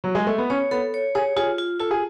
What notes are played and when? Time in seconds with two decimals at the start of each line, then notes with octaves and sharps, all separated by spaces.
0.04 F#3
0.15 G#3
0.27 A3
0.38 B3
0.50 C#4 C#5
0.71 B3 A4
0.94 C#5
1.15 G#4 C#5
1.36 F4 G#4
1.58 F4
1.80 F4 A4
1.91 G#4